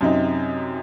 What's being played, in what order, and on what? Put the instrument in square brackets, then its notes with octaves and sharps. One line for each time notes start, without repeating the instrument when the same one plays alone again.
[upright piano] F#2 C3 D#4